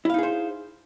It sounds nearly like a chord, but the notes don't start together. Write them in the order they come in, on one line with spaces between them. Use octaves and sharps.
E4 F5 D#4 G#4 C5